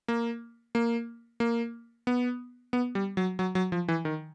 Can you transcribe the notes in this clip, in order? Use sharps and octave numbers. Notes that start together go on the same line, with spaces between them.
A#3
A#3
A#3
B3
B3
G3
F#3
F#3
F#3
F3
E3
D#3